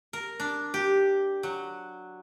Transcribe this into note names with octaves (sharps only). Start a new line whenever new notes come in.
A#4
D4
G4
F#3